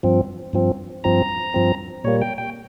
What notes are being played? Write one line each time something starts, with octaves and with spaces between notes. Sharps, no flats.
G2 F3 C4
G2 F3 C4
G2 F3 C4 A#5
G2 F3 C4
A#2 G3 A#3 C#5
G5
G5